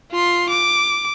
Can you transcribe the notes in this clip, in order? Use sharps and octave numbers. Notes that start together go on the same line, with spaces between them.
F4 C6
D6